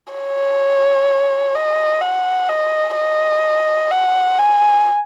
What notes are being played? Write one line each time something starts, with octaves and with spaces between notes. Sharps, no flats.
C#5
D#5
F#5
D#5
D#5
F#5
G#5